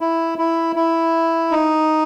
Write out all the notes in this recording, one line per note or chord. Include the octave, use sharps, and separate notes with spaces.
E4
E4
E4
D#4